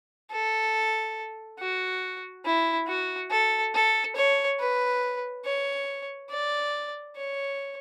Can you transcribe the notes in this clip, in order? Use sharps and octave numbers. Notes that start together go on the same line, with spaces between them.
A4
F#4
E4
F#4
A4
A4
C#5
B4
C#5
D5
C#5